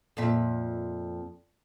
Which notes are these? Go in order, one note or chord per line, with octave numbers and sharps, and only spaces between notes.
F2 A#2 E5